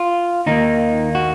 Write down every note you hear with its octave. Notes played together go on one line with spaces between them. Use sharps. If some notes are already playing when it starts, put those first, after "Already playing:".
Already playing: F4
D#2 D#3 A#3 D#4
F#4